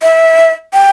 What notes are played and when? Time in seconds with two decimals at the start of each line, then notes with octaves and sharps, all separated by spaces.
0.02 E5
0.74 G5